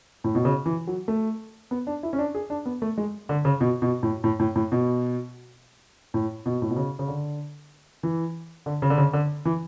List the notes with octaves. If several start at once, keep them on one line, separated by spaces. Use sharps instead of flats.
A2
B2
C#3
E3
F#3
A3
B3
D4
E4
C#4
D4
G#4
D4
B3
A3
G#3
D3
C#3
B2
B2
A2
A2
A2
A2
B2
A2
B2
A2
B2
C#3
C#3
D3
E3
D3
C#3
D3
C#3
D3
E3